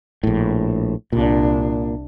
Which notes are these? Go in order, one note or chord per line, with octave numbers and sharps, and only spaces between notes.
A#1 A2
C2 A#2 D4